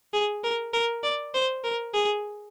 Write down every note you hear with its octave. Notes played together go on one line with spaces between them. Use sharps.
G#4
A#4
A#4
D5
C5
A#4
G#4